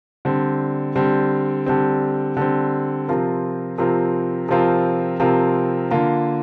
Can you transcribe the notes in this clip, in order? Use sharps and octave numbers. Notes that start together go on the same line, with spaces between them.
D3 G3 C4
D3 G3 C4
D3 G3 C4
D3 G3 C4
C3 F3 C4 F4 A#4
C3 F3 C4 F4 A#4
C3 F3 C4 F4 A#4
C3 F3 C4 F4 A#4
D3 A#3 F4 A#4